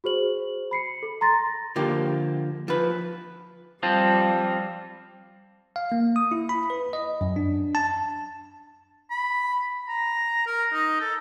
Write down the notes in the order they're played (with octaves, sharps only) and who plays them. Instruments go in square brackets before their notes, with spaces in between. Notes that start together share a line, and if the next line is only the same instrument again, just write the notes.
[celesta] F#4 G#4 C5 F#7
B5 C7 C#7
A4
A#5 C6 A6 A#6
[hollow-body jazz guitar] D3 F3 A#3 G4
F3 B4
[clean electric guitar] F3 C4 F4 [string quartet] G3 [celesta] A5
[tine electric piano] F5
A#3
D#6
E4
B5
B4
D#5
F#2
D4
A5
[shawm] B5
A#5
A#4
D#4
A4